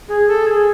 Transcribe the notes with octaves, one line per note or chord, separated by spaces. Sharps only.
G#4
A4
G#4